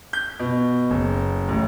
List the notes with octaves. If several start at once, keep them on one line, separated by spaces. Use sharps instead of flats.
G6
B2
F#1
A1